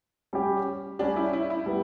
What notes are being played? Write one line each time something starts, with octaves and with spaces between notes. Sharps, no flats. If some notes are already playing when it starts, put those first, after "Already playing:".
G3 C#4 G4
G3 C#4 D4 G4
E4
E4
E4
G3 B3